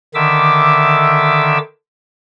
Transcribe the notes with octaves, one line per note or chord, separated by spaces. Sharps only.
D3 D#3 E5 D6 E6